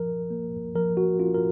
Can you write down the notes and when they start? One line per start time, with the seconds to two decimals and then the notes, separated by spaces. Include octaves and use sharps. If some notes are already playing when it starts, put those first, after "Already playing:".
Already playing: F3 A#4
0.30 A#3
0.75 F3 A#4
0.97 F#4
1.19 C#4 F4
1.34 A#4